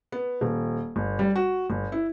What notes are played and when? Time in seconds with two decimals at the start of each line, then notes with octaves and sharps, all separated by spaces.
0.12 B3
0.41 D#1
0.96 G1
1.19 G3
1.36 F#4
1.70 G1
1.92 E4